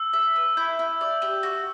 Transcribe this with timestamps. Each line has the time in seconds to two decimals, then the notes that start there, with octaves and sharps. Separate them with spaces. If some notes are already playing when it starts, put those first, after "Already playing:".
Already playing: E6
0.13 E5
0.36 B4
0.57 E4 G6
0.79 E4
1.01 D5
1.22 G4
1.43 F#4